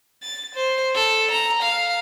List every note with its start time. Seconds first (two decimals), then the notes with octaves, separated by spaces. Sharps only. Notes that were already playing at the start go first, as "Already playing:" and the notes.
0.23 A6
0.55 C5
0.96 A4
1.31 A#5
1.63 F5